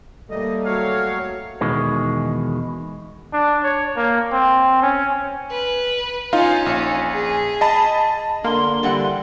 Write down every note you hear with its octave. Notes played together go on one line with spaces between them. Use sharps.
D#3 G3 A3 A#3 D#5
F#3 C#5 F5
E2 B2 D#3 G#3
D4
C#5
A#3
C4
C#4
B4
C#4 D#4 F4 F5
A#1
G#4
D#5 A5 B5
D3 A#3 C6
D3 E3 G3 F#5